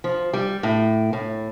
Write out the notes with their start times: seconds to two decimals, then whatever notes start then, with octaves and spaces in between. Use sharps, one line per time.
0.04 F3
0.33 G3
0.63 A2
1.13 A2